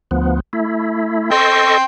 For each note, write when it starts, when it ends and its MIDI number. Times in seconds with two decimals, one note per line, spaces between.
0.11 0.40 38
0.11 0.40 53
0.11 0.40 59
0.53 1.30 57
0.53 1.30 64
1.32 1.78 69
1.32 1.78 75
1.32 1.84 79
1.32 1.84 84
1.32 1.78 85